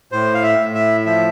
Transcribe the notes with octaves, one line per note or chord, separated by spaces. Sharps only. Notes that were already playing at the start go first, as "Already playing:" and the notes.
A2 C5
F5
E5
A2
E5
F3 E5